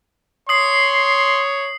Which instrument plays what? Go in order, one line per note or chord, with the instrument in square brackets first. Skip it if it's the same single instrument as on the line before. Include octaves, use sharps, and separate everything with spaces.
[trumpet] C#5 [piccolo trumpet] C6 [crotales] D#6 C7